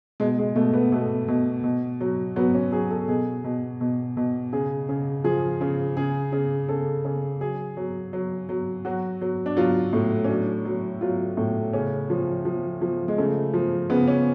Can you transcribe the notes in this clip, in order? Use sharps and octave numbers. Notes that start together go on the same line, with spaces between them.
B2 G#3
G#3
B2 A3
B3
B2 A3
B2
B2
F#3
F#3 B3
C#4
F#3 G#4
A4
B2 G#4
B2
B2
B2
C#3 G#4
C#3
F3 G#4
C#3
C#3 G#4
C#3
C#3 A4
C#3
F#3 G#4
F#3
F#3
F#3
F#3 F#4
F#3
D4
F#3 F4
A2
C#4
F#3 D4
F#3
F#3 F4
A2
C#3 C#4
F3
F3
F3
G#3
C#3 A3
F3
C#3 B3
C#4